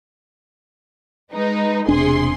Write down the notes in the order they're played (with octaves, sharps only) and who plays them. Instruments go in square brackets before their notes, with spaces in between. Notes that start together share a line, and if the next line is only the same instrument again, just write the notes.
[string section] G#3 D#4 B4
[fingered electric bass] E1 D4 [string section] C3 G#4 C6